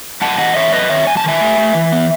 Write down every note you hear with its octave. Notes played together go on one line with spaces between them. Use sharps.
F#2 F#5 A5
E3 D#5 F#5
E3 C#5 E5
F#2 B4 D#5
D#3 C#5 E5
F#2 G#5
A5
D#3 E5 G#5
A3
A3
E3
B3